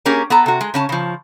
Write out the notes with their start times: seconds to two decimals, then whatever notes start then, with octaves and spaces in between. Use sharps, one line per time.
0.05 A#3 C#4 G4 G#4 A#4
0.30 B3 A4 A#5
0.46 C3 F#4
0.61 G#3
0.74 C#3 C#4 A5
0.89 C#3 F3